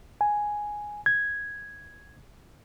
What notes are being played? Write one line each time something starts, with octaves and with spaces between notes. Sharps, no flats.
G#5
G#6